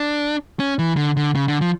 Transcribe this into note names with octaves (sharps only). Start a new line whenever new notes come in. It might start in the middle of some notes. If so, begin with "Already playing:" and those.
Already playing: D4
C#4
E3
D3
D3
C#3
D3
F3